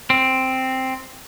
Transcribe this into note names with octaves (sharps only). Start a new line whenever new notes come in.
C4